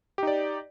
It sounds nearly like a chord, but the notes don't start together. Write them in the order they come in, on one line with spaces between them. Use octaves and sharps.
G4 D#4 D5